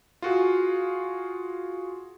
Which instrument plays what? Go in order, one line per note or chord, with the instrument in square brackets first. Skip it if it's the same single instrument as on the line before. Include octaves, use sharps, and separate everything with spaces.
[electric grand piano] F4 F#4 G#4